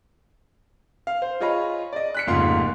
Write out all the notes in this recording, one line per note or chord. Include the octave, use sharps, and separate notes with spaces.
F5
C5
F4 G#4 C#5 D#5 F5 B5
D5 D#5
F#6 B6 C#7
F1 G#2 C#3 A#3 F4 C6